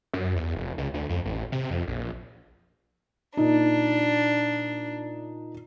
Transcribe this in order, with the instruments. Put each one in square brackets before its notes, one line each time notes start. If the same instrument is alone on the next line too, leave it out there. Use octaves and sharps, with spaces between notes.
[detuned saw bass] F#2
E2
F1
C#2
D2
F2
A1
C3
F2
A#1
[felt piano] A#2 D#4 [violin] D4